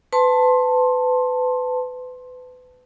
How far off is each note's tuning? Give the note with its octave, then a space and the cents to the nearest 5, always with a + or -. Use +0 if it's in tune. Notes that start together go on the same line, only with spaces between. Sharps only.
B4 +30 A5 +5 C6 +15